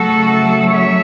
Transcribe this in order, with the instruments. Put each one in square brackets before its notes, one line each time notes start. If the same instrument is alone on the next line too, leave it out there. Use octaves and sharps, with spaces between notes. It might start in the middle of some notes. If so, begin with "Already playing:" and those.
Already playing: [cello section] C#3 F#3 A3 F#4 A4
C#5 E5